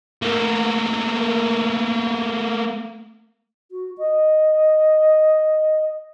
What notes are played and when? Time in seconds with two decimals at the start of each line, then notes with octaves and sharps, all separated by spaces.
0.22 A3 A#3
3.72 F#4
3.98 D#5